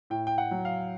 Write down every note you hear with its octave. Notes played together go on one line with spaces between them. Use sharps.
A2 G5
G5
F#5
F#3
F5